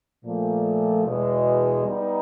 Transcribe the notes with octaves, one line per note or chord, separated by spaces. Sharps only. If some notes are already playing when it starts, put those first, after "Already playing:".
A#2 F3 A3
E2 B2 G#3
G3 B3 D#4